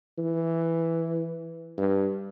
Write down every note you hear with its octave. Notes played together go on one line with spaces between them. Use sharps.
E3
G2